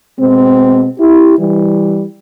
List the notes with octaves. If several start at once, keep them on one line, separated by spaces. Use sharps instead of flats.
B2 G#3 C4
E4 G4
E3 G3